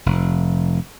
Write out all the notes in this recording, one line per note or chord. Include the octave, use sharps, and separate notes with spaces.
F1